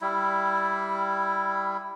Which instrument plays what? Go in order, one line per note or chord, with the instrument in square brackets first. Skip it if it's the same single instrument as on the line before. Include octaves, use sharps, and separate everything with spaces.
[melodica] G3 E4